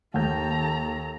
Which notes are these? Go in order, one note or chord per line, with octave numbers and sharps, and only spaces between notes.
D#2 A4 A#5 G6